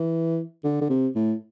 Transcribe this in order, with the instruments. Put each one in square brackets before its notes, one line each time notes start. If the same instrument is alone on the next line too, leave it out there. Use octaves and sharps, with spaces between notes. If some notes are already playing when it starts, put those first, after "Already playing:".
Already playing: [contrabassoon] E3
D3
D3
C3
A2